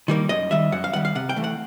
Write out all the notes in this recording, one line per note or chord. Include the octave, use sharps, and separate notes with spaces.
D#3 G3 A#3
F#2 D#5
D#3 G3 E5
F#2 F#5
F5
D#3 G3 F#5
F5
C3 F#5
G5
E3 A3
F#5